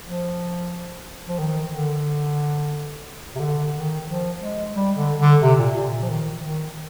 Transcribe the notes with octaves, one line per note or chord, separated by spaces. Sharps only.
F3
F3
D#3
D3
C3
D3
D#3
F3
G#3
G3
D3
D3
C3
A#2
A#2
F3
D#3
D#3